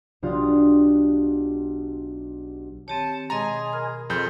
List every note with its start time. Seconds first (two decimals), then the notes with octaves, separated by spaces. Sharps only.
0.23 B1 D4 F4 G4 D5 D#6
2.88 D#3 C4 G4 C#5 A5
3.30 B2 G#3 G#4 D#5 G#5 A#5 C6 A6
3.73 A#4 B5 F6
4.10 F2 G#4 A4 C6 F6 G6